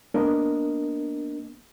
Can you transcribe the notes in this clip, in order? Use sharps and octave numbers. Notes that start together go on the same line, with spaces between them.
A#3 B3 D4 A#4 D#5